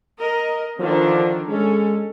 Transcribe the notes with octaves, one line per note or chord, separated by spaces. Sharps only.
A#4 D#5
D3 D#3 F3 D4
G#3 C#4 A4